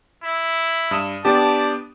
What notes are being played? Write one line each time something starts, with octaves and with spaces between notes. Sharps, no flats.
E4
G2 D#6 E7
B3 D4 G4 D5 A5